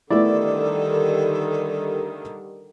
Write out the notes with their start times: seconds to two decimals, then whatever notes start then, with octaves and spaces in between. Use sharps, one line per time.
0.11 D3 D#3 G3 A3 B3 E4 A4 D5